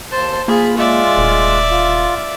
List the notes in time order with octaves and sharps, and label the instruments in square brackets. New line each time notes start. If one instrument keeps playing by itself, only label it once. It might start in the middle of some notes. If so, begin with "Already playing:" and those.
[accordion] D#2 A5 [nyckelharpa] C5
[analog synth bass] A#3 [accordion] F4 B5 [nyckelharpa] G#4
[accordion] G#3 F4 [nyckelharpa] D5 E5
[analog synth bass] D#1
[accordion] F4